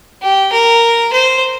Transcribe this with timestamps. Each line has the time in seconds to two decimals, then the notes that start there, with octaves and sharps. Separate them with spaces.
0.22 G4
0.52 A#4
1.13 C5